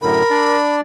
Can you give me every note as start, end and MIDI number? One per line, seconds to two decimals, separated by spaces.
0.02 0.22 42
0.02 0.22 45
0.02 0.22 50
0.02 0.56 70
0.02 0.75 83
0.30 0.81 62
0.30 0.81 74